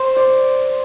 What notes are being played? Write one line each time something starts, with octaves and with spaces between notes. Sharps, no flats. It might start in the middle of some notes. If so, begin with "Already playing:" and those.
Already playing: C5
D5